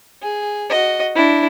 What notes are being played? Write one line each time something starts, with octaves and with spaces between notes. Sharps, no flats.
G#4
F#4 D#5
D4 E4